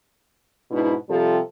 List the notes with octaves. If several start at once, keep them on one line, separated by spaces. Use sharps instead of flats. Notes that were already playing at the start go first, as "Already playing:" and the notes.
G#2 B2 D4 E4
C3 F3 G3 A4